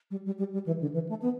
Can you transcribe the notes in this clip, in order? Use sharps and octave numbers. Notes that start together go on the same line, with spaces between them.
G3
G3
G3
G3
E3
D3
E3
A3
B3